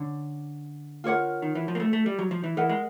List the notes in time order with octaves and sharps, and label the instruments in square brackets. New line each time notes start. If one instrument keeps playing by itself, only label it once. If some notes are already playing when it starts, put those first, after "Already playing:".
Already playing: [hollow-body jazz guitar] D3 [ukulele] C#4
[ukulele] F4 A#4 C#5 F#5
[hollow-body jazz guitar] D#3
E3
F3
A#3
A3
A3
G3
F#3
F3
E3
[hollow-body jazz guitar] E3 [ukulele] A#4 D#5 F#5
[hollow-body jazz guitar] G#3